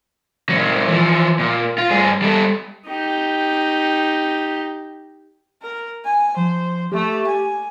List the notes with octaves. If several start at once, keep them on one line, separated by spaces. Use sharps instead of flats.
A#2 F#3
E3 F3
A#2
F4
G2 G#4
G3 A4
D#4 G4
A#4
G#5
F3 C5
A3 G4
G#5